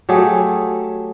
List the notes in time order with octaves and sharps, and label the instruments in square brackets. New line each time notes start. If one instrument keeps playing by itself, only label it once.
[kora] F#3 A3 G4 G#4